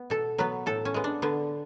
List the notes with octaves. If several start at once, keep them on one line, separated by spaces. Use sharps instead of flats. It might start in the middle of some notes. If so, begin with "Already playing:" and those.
Already playing: B3
B2 A4
F#3 B3 B4
A2 A4
C#4
G#3 B3
D4
D3 B3